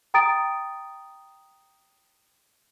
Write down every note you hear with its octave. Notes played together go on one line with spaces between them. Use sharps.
G5 A#5 D#6 A6 D7